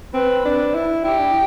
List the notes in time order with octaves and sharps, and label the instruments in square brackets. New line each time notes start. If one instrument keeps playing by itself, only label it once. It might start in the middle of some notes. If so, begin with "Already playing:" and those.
[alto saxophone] C4 [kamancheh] B4
[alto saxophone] D4
E4
[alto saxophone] E4 [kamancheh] G4
[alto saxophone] D4